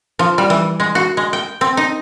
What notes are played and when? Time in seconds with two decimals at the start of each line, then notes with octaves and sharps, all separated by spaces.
0.19 F3
0.38 G3
0.50 E3
0.80 G#3
0.95 F#4
1.17 G#3
1.33 G5
1.61 C4
1.77 D#4